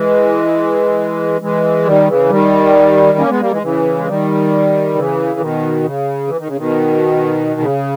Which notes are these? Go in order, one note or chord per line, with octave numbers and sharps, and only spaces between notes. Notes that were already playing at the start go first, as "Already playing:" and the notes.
Already playing: E3 G#3
E3 G#3
D#3 G3
C#3 E3
D#3 G3
A#3 C#4
G#3 B3
G3 A#3
E3 G#3
C#3 E3
G#3
D#3 G3
C#3 E3
B2 D#3
C#3
E3
D#3
C#3
B2 D#3
C#3